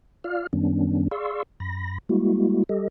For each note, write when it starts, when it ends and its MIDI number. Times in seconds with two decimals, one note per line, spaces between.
0.24 0.47 65
0.24 0.47 74
0.24 0.47 77
0.24 0.47 89
0.53 1.08 42
0.53 1.08 51
0.53 1.08 55
0.53 1.08 59
0.53 1.08 61
0.53 1.08 62
1.11 1.43 68
1.11 1.43 74
1.11 1.43 77
1.11 1.43 84
1.11 1.43 85
1.11 1.43 88
1.60 1.98 42
1.60 1.98 83
1.60 1.98 94
2.09 2.64 55
2.09 2.64 56
2.09 2.64 58
2.09 2.64 64
2.09 2.64 66
2.69 2.88 55
2.69 2.88 67
2.69 2.88 69
2.69 2.88 75